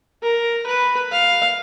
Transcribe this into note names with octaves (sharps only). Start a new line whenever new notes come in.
A#4
B4
F5